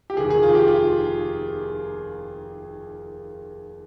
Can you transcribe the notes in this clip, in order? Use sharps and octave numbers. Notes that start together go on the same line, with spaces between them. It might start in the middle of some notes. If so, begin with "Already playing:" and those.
G4
F1 D#2 D#3 G#4
G#4
F4
G4
F4